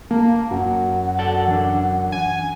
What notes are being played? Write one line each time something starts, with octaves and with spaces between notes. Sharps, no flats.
A#3 A5
F#2 F#5
A4 D5 A5
E3 D4
F#5 G#5